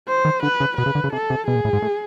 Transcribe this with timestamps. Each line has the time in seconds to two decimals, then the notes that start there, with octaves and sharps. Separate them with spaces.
0.08 C5
0.25 D#3
0.43 D3 B4
0.60 C#3
0.77 B2 B4
0.86 C#3
0.95 D3
1.04 C#3
1.13 C3 A4
1.30 C3
1.47 B2 G#4
1.55 A#2
1.64 A2
1.73 G#2
1.82 A2